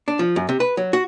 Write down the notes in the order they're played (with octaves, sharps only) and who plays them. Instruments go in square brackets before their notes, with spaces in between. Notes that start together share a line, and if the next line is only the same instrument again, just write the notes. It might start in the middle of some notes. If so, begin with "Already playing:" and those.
[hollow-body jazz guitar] D4
F3
F#2
C3
B4
F#3
F#4